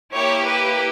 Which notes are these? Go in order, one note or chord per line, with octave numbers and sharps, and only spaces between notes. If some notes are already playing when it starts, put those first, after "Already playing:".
A#3 E4 G4 C#5
B4